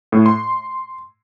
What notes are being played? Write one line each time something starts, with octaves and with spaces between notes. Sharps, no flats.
A2
C6